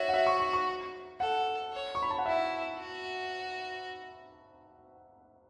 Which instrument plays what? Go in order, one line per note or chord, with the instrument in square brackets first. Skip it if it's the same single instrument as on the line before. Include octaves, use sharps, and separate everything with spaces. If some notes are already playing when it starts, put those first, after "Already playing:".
Already playing: [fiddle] F#4 [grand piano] C#5 E5
[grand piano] F#5
E5
C#6
C#6
C#6
[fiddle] A4 [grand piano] F#5
[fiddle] C#5
[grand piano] C#6
B5
A5
F#5
[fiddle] E4 [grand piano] E5
[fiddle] F#4